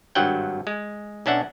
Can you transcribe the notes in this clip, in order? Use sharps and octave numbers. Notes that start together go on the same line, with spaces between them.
G#1 G2 F#3 F#5 G5
G#3
B1 C#4 D4 E5 F#5